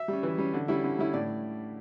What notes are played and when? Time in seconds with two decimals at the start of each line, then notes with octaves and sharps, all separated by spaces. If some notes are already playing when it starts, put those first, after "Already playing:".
Already playing: E5
0.08 G3 C#4
0.23 E3
0.38 G3 C#4
0.54 D3
0.68 G3 C#4 E4
0.84 D3
0.99 G3 C#4 E4
1.13 A2 D5